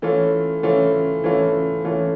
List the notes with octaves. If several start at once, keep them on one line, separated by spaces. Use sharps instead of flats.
E3 A3 C#4 F4
E3 A3 C#4 F4
E3 A3 C#4 F4
E3 A3 C#4 F4